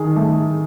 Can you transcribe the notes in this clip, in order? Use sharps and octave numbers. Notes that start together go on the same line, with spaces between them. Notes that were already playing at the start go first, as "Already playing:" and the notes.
Already playing: D#3 G#4
A3